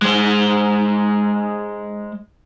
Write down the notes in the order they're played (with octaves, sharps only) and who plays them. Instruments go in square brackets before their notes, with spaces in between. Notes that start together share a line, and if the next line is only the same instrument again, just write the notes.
[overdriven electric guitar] G#3 C5